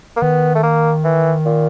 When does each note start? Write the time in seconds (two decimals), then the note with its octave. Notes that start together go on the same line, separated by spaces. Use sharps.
0.16 A#3
0.22 D#3 B3
0.55 A3
0.63 A#3
1.04 E3
1.45 A#2